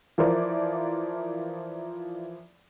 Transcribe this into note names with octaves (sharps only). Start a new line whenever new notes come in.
E3 F3 A#4 C5 D5